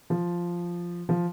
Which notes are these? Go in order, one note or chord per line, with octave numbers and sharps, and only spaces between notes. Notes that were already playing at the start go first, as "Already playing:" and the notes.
F3
F3